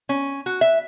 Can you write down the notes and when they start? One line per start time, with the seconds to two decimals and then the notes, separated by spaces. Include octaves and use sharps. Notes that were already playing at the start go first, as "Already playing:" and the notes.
0.09 C#4
0.46 F#4
0.61 E5